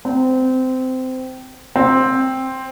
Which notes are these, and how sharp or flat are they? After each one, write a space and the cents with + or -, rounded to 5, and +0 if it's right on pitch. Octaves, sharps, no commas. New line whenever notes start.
C4 -20
C4 +5